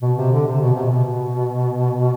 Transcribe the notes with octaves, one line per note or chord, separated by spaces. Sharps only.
B2
C3
D3
C3
B2
C3
B2